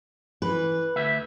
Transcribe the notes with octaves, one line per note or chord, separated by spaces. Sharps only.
E3 B4
D2 E5